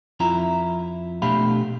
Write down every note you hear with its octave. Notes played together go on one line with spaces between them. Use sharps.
F2 E4 F4 E5 A#5
B2 A3 D4 G4 F5 B5